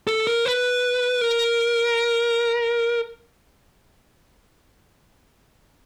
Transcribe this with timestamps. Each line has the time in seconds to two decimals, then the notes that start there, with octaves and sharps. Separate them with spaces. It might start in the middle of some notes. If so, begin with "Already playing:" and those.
0.07 A4
0.27 A#4
0.45 B4
1.21 A#4